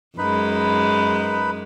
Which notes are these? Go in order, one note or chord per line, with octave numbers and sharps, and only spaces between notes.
F#2 G#3 D#4 B4 B5